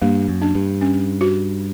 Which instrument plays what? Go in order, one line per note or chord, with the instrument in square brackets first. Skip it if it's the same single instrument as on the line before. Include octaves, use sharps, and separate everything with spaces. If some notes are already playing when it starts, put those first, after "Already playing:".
[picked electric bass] G2 [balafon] A#3
[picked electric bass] F#2
[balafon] D4
[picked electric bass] G2
[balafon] C#4
F#4